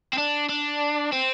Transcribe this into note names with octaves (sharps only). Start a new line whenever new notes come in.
C4
D4
D4
C4